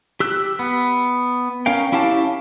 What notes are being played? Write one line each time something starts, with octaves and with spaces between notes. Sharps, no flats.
G4 E6 F#6
B3
C#4 A#4 F5 G5
C#4 E4 G4 F5 A5